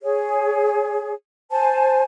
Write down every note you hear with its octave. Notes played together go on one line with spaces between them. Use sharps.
G#4 C#5
C5 G#5 A5